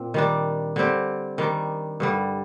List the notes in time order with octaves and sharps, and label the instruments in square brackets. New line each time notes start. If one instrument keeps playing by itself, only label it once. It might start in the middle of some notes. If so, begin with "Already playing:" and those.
Already playing: [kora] A#2 C4
D#3 G3 D4
D3 G3 C4 G4
D#3 G3 D4
G2 D3 G3